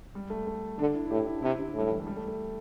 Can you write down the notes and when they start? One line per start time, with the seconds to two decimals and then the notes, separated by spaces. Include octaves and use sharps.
0.15 G3
0.30 A3
0.47 A3
0.79 D3 D4
0.94 E4
1.06 E4
1.11 A2 G4
1.27 E4
1.36 D4
1.42 C3 E4
1.59 D3
1.74 A2 G3
1.90 E3
2.00 A3
2.07 G3
2.17 A3
2.28 A3